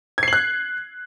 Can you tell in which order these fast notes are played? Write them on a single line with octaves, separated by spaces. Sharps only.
G#6 C7 F#7 F#6